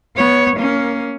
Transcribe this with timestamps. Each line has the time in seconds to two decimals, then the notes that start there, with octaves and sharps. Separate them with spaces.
0.16 B3 C#5
0.57 A#3 C#4